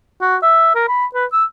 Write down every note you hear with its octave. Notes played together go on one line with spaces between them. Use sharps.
F#4
E5
A#4
B5
B4
E6